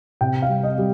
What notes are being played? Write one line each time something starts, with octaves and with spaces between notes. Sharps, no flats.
C3 G5
F5
G3
D#5
G3